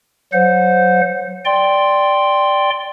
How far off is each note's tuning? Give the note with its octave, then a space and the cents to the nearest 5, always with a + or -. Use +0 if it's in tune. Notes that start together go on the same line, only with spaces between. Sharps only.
F#3 +0 C5 -15 F#5 -35
D5 +0 G5 +0 C6 +0